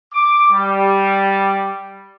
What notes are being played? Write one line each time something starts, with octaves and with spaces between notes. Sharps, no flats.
D6
G3